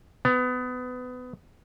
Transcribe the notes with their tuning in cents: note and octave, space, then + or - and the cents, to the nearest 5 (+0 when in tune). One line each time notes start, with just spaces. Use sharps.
B3 +25